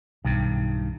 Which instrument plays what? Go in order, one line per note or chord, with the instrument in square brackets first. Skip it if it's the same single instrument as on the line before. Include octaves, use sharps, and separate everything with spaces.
[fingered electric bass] B1 [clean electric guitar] G2 D#3